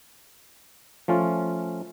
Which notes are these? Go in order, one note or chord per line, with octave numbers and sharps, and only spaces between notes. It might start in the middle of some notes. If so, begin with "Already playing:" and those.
F3 A3 C#4 F4